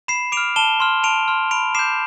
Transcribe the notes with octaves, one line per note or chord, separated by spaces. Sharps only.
B5 C7 E7
D6 D7 F7
F6
A5 E7 G7
C6 F6
A5 D7 F7
C6 F6
B5 D7 F7
D6 G6 C7 E7